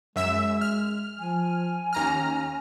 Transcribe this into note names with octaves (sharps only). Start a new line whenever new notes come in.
F#2 G#3 E5 E6
F6
F3 G#5
D#2 C#4 A#5 F6